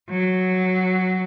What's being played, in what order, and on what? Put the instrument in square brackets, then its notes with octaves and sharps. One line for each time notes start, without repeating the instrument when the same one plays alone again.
[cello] F#3